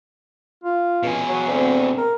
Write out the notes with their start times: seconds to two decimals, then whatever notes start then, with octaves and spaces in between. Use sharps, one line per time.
0.64 F4
1.03 C#2 B2 G#4
1.29 F#3 C#5
1.48 D2 C4
1.98 A#4